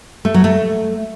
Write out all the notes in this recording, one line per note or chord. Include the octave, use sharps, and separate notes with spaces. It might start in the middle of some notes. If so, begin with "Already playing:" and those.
A3
F#3
A3